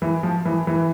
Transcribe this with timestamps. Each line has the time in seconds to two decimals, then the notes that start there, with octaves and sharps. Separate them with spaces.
0.02 E3
0.23 F3
0.45 E3
0.67 E3